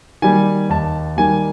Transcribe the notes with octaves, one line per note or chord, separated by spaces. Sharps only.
D#3 G3 A#3 G#5
D#2 A5
D#3 G3 A#3 G#5